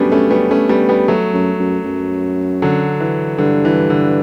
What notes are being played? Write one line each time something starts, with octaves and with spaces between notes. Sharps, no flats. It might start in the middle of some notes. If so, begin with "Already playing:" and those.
Already playing: F#2 G3 A3 B3 C#4 D4
A3 C#4
G3 B3
A3 C#4
G3 B3
G3 B3
F#3 A3
F#2
F#2
F#2
D3 F#3
E3
G2 D3
E3
D3